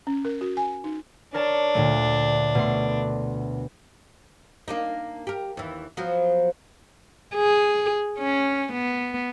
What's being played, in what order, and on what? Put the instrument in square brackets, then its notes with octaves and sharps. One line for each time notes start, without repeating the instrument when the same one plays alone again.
[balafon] C#4
A#4
F#4
G#5
D#4
[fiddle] D4 [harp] A#4 C#5 A5
[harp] D2 A#2 A3
B2 A3 C6
[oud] A#3 D4 D#4
G4 A#4
D#2 E3
F3 F#3 B3
[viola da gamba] G#4
C#4
B3